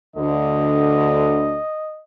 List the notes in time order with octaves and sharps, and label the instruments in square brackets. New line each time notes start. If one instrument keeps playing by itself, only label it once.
[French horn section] D2 D3 [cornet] D#5